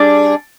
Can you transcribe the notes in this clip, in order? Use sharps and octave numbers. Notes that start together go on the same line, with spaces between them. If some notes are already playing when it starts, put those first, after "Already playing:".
Already playing: G3 D4 G#4